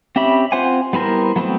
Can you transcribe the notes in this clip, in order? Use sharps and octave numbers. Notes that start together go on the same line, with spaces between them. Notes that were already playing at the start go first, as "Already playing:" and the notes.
C4 C#4 G4 E5 B5
C4 F4 C5 F#5 G#5
G3 B3 E4 A#4 C5
F#3 A3 B3 C4